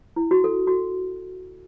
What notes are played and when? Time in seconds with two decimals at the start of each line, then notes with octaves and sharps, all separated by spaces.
0.16 E4
0.31 F#4
0.44 A4
0.67 F#4